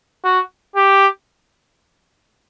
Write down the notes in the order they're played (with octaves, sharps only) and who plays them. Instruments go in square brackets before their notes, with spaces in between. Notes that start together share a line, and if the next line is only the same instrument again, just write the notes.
[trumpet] F#4
G4